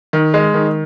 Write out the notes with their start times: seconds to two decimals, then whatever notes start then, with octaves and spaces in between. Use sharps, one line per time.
0.13 D#3
0.34 G#3
0.54 D#3